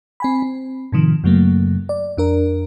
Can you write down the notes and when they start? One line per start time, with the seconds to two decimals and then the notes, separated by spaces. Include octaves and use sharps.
0.20 C4 G#5 B5
0.42 C4
0.92 A2 C3 D#3 F3
1.24 F#2 C#3 F#3 A3 A#3
1.89 D5
2.17 F2 D4 A#4